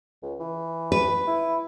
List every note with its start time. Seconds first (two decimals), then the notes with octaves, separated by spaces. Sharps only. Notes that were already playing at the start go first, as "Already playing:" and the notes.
0.23 C#2
0.40 E3
0.92 B4
1.27 E4